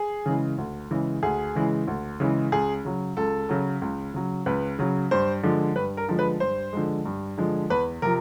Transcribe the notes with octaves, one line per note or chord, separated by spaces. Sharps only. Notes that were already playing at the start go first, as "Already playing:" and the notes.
Already playing: G#4
C#3 E3 G#3
D2
C#3 E3 G#3
D2 G#4
C#3 E3 G#3
D2
C#3 E3 G#3
C#2 G#4
C#3 F#3
C#2 A4
C#3 F#3
C#2
C#3 F#3
C#2 B4
C#3 F#3
G2 C5
D3 F3 G#3
G2 B4
A#4
D3 F3 G#3
B4
G2 C5
D3 F3 G#3
G2
D3 F3 G#3
E2 B4
C3 F3 A#4